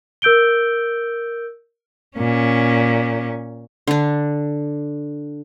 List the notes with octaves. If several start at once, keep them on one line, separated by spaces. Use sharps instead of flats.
A#4 E6 G6 D7 G7
A#2 C#4
D3 D4